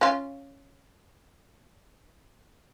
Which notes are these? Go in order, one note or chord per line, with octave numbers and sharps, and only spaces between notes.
C#4 F4